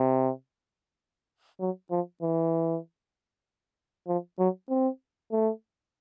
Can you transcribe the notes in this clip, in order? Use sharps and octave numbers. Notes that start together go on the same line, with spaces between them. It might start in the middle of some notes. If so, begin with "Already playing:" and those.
Already playing: C3
F#3
F3
E3
F3
F#3
C4
A3